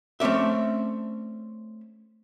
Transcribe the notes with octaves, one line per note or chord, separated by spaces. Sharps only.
A3 C4 C#4 D5 E5